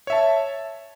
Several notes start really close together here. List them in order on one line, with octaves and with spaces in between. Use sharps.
C#5 E5 A5